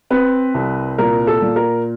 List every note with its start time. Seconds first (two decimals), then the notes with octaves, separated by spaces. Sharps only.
0.10 C4 B4
0.54 C2
0.98 A#2 A#4
1.27 A4
1.42 A#2
1.56 A#4